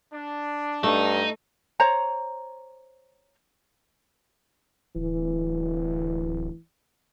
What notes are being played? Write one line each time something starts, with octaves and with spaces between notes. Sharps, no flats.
D4
G2 A3 D#4
C5 C#5 A#5
D1 E3